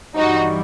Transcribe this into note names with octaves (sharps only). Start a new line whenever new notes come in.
G2 E3 G3 D#4 F#4